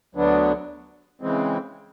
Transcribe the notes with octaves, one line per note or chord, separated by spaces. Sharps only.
D2 D3 F#3 B3 D4
C#3 E3 G#3 C4